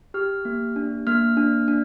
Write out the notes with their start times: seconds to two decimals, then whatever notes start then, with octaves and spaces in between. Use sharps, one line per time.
0.14 G4 F6
0.45 A#3
0.76 D4
1.07 A#3 F6
1.37 D4
1.68 D4